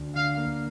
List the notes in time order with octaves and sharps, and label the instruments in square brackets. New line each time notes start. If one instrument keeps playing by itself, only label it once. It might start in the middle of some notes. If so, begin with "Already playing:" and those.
Already playing: [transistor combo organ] D2
[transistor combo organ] D3 [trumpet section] F5
[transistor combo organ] A#3